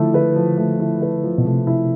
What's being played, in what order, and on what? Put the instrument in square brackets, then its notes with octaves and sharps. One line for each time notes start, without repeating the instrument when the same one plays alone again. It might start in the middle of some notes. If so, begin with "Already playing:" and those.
Already playing: [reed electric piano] D3 [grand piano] F3 A3 E4
[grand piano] B4
F3
A3
E4
B4
F3
[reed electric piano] B2
[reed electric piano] C3 [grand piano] A3
[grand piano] E4